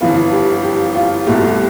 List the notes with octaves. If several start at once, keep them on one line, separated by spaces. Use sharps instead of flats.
G1 F2 E3 B3 F4
G4
G4
F4
C2 B2 A3 G4